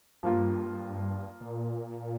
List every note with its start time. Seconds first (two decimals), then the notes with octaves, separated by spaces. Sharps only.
0.23 G2 F3 A#3 F4
1.41 A#2